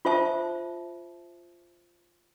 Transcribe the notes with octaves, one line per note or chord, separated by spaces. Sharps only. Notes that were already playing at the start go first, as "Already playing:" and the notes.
F4 C5 E5 A5